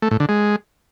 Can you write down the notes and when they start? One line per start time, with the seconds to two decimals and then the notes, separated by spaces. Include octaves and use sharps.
0.02 A3
0.11 A2
0.20 D3
0.29 G#3